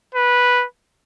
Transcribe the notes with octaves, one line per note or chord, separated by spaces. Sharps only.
B4